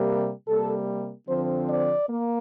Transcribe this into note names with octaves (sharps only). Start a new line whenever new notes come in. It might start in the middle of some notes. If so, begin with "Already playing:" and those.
Already playing: C3 G3 A#3
C3 G3 A#3 A4
D3 F3 C4 C5
D5
A#3